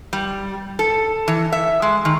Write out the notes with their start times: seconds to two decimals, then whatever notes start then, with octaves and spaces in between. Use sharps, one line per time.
0.13 G3
0.79 A4
1.28 E3
1.52 E5
1.82 G#3
2.05 D#3